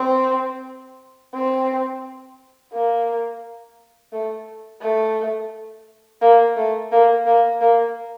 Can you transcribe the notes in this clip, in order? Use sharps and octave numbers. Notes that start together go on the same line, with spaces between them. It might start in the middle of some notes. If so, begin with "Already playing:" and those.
Already playing: C4
C4
A#3
A3
A3
A#3
A3
A#3
A#3
A#3